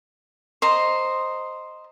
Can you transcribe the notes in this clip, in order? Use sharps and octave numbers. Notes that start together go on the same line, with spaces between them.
C5 D#5 A#5